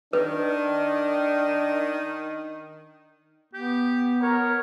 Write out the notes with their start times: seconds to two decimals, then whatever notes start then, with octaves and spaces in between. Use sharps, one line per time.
0.13 D#3 D4 B4
3.54 B3 G4
4.22 A#4 C#5